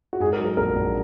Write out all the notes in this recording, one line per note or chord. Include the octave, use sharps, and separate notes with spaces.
F#4
G#2 G#4
A#4
F#3
A#4
A#1 A#4
A#1